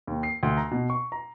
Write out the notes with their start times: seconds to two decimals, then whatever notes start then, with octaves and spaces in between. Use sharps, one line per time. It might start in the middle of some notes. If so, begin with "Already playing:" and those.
0.07 D#2
0.23 C7
0.43 D2
0.57 A#5
0.71 B2
0.90 C#6
1.12 A#5